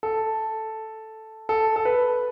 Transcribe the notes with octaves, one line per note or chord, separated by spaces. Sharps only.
A4
A4
A4
B4